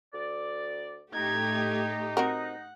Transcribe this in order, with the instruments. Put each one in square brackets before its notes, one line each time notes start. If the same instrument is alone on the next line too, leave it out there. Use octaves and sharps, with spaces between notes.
[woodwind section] D2 D5
[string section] A2 A3 G4 [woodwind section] D#4 [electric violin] G#6
[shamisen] C4 F#4 A#4 [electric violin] F#5